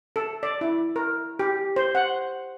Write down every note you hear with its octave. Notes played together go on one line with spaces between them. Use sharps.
A4
D5
E4
A#4
G4
C5
F#5